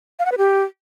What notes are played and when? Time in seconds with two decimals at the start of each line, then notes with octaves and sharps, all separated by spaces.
0.19 F5
0.25 F#5
0.32 B4
0.38 G4